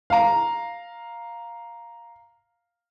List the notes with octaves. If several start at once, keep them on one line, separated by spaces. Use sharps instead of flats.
F5 A#5